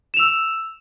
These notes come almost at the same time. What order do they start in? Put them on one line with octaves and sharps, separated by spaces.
E7 F7 E6